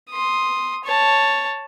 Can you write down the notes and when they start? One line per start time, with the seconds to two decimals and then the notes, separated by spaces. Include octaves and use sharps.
0.10 C6 D#6
0.85 C#5 A5